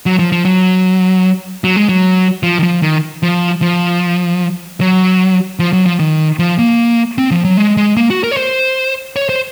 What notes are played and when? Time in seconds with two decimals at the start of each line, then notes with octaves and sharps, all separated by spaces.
0.06 F#3
0.19 F3
0.32 F3
0.45 F#3
1.64 F#3
1.76 G#3
1.89 F#3
2.43 F3
2.59 D#3
2.63 F3
2.82 D#3
3.23 F3
3.62 F3
4.81 F#3
5.59 F3
5.73 F#3
5.86 F3
5.99 D#3
6.39 F3
6.59 A#3
7.18 C4
7.31 F3
7.45 F#3
7.57 G#3
7.77 G#3
7.97 A#3
8.10 F#4
8.24 A#4
8.31 C#5
8.37 C5
9.16 C#5
9.29 C5